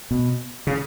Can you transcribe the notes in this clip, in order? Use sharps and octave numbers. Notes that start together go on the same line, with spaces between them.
B2
C#3